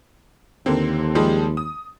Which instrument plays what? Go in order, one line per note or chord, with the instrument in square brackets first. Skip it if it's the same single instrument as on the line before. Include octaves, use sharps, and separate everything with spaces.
[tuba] D#2 [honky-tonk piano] D3 A#3 C4
[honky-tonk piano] F3 G3 G#3
D#6